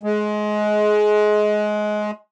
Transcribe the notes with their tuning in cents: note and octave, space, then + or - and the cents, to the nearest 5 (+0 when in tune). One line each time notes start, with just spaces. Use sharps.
G#3 +20